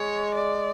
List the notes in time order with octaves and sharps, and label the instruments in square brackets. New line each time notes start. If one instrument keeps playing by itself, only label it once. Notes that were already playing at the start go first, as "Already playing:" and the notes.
Already playing: [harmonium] G#3 [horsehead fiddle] C#5
[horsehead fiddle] D5